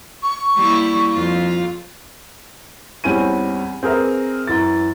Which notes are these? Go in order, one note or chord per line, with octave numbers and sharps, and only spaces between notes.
C#6
G3 A#3 E4
F2 F4
E2 G3 C4 C#4 G#5 D#7
C4 G#4 A#4 B4 E5
F#2 E3 A6